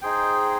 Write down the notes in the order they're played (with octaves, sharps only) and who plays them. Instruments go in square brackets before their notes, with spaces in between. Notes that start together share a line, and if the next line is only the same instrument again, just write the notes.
[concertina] D#4 G#4 C5 G5